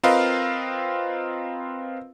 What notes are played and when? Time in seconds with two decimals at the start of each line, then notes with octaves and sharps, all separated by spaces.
0.03 C4 F4 A#4 B4 D#5 F5